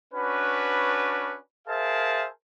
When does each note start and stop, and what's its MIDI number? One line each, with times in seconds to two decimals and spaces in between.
0.14 1.36 61
0.14 1.36 62
0.14 1.36 66
0.14 1.36 71
1.67 2.26 68
1.67 2.26 70
1.67 2.26 72
1.67 2.26 76
1.67 2.26 77
1.67 2.26 81